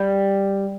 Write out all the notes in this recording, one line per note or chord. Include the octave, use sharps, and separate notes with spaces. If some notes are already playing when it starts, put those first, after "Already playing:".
Already playing: G3